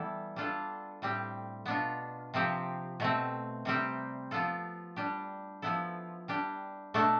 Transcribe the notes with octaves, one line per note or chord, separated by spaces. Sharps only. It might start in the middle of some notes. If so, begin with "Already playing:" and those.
Already playing: E3 G3 B3 E4 A4
G3 D4 F4 A4
A2 G3 C4 G4
B2 B3 D4 F4
C3 F3 C4 G4
B2 A3 C4
C3 G3 C4 G4
F3 B3 F4 A4
G3 D4 G4
F3 B3 E4 A4
G3 D4 G4
B2 A3 D4 A4